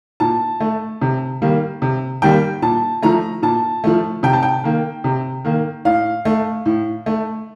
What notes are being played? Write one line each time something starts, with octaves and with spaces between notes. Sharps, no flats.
A#2 A5
A3
C3
D#3 G3 A#3
C3
D#3 G3 A#3 G5
A#2 A5
F3 A3 A#5
A#2 A5
F3 A3
C3 G5
A5
G5
D#3 A#3
C3
D#3 A#3
A2 F5
A3
A2
A3